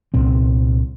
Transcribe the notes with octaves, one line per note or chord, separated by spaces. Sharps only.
C2 A#2 C4